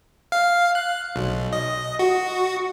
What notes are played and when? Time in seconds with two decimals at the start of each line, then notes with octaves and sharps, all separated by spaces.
0.32 F5
0.75 F#6
1.16 B1
1.53 D#5
1.99 F#4